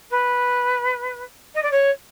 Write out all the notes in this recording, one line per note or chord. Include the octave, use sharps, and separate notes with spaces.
B4
D#5
D5
C#5